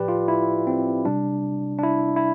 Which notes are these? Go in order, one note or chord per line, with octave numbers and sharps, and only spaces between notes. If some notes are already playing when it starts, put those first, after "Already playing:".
Already playing: A2 F3 G4 B4 D5
F4
E4
C4
C3 G3 D4
D4
E4
E4